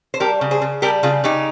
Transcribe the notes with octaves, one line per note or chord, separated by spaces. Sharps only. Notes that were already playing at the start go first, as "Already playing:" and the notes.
C5
G3 G4 A#4
C#3
G#4 C5
C#3
G3 G4 A#4
C#3 F4 G#4
C#3 D#4 G4